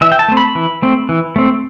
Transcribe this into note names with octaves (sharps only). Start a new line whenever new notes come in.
E3 E5
G5
A5
A3 C4
B5
E3
A3 C4
E3
A3 C4